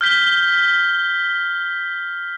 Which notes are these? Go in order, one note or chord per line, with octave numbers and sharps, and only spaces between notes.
F6 G6 B6 G7